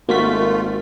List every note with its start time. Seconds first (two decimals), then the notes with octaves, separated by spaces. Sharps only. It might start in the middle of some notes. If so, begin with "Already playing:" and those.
0.09 G#1 A3 A#3 F4 F#4 B6